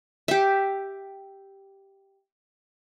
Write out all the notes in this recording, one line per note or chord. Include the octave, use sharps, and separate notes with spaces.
G4 E5